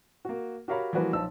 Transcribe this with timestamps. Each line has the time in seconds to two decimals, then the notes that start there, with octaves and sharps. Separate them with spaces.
0.25 A#3 F#4
0.68 F#4 G4 A#4 C#5 F5 B5
0.93 E3 F3 G3 A#3 F#4 B4
1.13 B1 F3 A5 E6